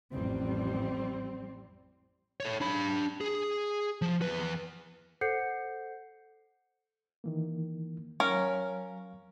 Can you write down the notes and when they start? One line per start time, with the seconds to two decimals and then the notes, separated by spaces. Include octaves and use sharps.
0.12 A1 F2 G3 C4
2.40 A4 C#5
2.61 D4 B5
3.21 G#4
4.02 F3
4.22 E2 B4
5.21 A4 C5 F#5 G6 C7 C#7
7.24 D#3 E3 A#3
8.20 F#3 C#4 A#4 F5 C#6